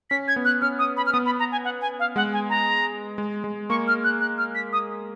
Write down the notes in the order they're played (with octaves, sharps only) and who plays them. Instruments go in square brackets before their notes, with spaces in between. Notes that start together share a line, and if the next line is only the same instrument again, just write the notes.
[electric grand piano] C#4 [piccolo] B6
[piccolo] G#6
[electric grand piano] B3
[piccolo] F#6
[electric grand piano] C#4 [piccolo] F6
[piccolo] D#6
B5
F6
[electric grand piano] B3 [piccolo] D#6
[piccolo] B5
A#5
G#5
F#5
G#5
F5
[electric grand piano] G#3 [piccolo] F#5
[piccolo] G#5
A#5
[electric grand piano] G#3
G#3
[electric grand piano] A#3 [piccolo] C#6
[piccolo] F6
F#6
F#6
F6
B6
D#6